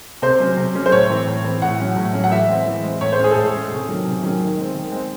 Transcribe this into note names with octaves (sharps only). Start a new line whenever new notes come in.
C3 C5
F#3 C#4
C3
F#3 C#4
C5
A2 C#5
E3 C4
A2
E3 C4
A2 F#5
F#3 C#4
A2
F#3 C#4
F#5
E3 E5
G#3 C4
E3
G#3 C4
A2 C#5
C5
G#3 C#4
G#4
A4
A2 G#4
G#3 C#4
C3
D#3 F#3 C#4
C3
D#3 F#3 C#4
D#3
G#3 C4
D#3
G#3 C4